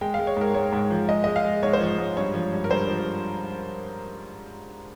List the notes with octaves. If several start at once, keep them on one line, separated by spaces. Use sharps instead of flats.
G#3 G5
F5
G#3
C#5
G#2 A#4
G#2 C#5
G#2
F3
G#3 D#5
G#3 D#5
F5
G#3
G#2 C#5
C5
F3 C#5
G#2
G2 C#5
F3
G2
A#4
G2 C5
F3